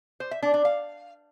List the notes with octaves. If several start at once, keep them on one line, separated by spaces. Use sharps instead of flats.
C5
E5
D4
D4
F5